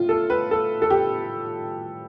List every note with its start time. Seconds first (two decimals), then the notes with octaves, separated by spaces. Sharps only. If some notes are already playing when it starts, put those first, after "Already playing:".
Already playing: A2 F4
0.09 A4
0.30 B4
0.51 A4
0.82 A4
0.90 G4